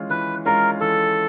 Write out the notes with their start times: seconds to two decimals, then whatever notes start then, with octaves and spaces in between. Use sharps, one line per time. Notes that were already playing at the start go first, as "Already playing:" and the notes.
Already playing: E3 G#3 C#4 F4
0.10 E3 B4
0.46 G#3 C#4 F4 A#4
0.81 E3 A4